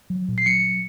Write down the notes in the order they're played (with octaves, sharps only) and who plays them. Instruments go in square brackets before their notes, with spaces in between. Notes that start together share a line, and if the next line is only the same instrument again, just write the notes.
[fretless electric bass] F#3
A#2
[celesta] C7
[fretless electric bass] F#3 [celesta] C#7